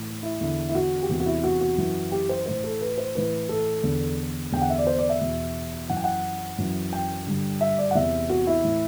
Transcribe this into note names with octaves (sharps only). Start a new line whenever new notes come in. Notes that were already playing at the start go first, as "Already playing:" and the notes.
Already playing: A2 E3
E4
E2 D3 E4
E4
F#4
G4
E2 C3 E3 F#4
F#4
E4
F#4
F#4
F#2 E3
G4
C5
A2 E3 C5
A4
B4
C5
A2 E3 B4
A4
E2 D3
E2 D3 G5
F#5
E5
D5
C5
D5
E5
E2 B2
F#2 E3 F#5
G5
F#5
F#2 E3
G5
G2 D3
E5
D5
F#5
E2 C3 E3 E5
F#4
E4
A2 E3